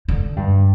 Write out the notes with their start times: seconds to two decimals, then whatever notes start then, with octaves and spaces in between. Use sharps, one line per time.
0.08 D3
0.36 G2